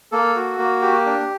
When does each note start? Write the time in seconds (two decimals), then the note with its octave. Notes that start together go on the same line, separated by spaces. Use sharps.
0.12 A#3 A4
0.36 F#4
0.58 A#3
0.82 G4
1.06 D4